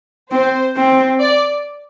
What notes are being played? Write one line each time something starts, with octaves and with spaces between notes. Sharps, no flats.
C4 C5
C4
D5